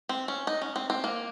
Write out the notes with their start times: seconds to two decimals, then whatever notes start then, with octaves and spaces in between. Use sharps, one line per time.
0.09 C4
0.28 C#4
0.47 D#4
0.62 C#4
0.76 C4
0.90 C4
1.04 A#3